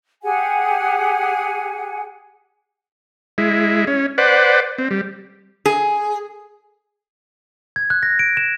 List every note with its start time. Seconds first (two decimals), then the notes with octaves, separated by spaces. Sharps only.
0.23 G4 G#4 F#5 G#5
3.38 G#3 E4
3.87 C#4
4.18 B4 C5 D5 F#5
4.78 C4
4.91 G3
5.66 G#4
7.76 G#6
7.90 F#6
8.03 A#6
8.19 D7
8.37 E7